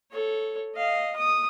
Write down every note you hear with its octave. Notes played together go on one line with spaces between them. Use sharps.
A4 C#5
D#5 F5
D#6